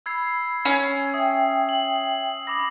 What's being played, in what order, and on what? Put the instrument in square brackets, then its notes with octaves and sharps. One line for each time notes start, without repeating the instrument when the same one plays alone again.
[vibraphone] B5 [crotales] E6 G#6 C7
[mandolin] C#4 [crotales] C7
[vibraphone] E5 G5 [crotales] D#6
[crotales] F#7
[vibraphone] B5 [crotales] D6 D#6 A#6